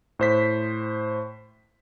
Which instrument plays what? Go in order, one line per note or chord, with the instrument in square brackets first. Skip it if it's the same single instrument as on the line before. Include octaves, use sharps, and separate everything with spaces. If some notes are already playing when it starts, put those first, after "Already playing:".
[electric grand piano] A2 C5 B6